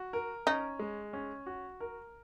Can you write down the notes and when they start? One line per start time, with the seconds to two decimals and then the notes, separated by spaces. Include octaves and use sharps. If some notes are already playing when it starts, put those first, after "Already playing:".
Already playing: F#4
0.13 A#4
0.47 C#4 D#4
0.79 G#3
1.13 C#4
1.46 F#4
1.80 A#4